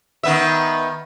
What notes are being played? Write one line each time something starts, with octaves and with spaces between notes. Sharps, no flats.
D#3 B3 E5